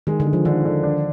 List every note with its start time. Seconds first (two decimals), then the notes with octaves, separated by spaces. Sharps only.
0.07 D#3 G#3
0.20 D3
0.27 G#3
0.33 F3
0.45 D3 D#3
0.65 D3
0.83 D4